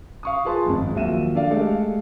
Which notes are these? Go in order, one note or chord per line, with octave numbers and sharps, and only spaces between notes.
F5 C#6 D#6
F4 G#4 B4 A5 C6
G#1 F2 G#2
D#2 F3 F#3 E5 D#7 E7
D4 A4 D5 F5
G#3 A3 G4 A4 F5